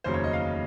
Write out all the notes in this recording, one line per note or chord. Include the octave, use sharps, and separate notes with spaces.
F1 D#2 C#3 F#3 C5
C#5
D#5
F5